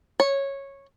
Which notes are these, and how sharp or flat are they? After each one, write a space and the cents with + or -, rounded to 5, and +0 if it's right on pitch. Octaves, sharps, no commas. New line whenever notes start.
C#5 -10